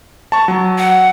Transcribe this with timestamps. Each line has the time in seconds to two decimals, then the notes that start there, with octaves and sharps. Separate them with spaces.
0.32 A5 C#6
0.48 F#3
0.78 F#5